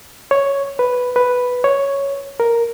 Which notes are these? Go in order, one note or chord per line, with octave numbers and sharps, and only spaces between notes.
C#5
B4
B4
C#5
A#4